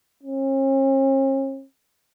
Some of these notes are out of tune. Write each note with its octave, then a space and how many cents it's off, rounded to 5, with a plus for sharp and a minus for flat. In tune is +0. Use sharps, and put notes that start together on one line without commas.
C#4 -45